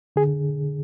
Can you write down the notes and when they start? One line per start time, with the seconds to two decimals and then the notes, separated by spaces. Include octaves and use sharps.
0.16 D3 G#4